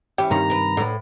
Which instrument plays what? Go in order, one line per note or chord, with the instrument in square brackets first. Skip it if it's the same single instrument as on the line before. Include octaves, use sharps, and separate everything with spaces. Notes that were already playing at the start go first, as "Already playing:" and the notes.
[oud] E3 C#4 [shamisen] G4
[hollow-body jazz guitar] G2 C3 D#3 [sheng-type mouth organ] A#5
[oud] A#4 B4
[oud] A2 B4 [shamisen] D3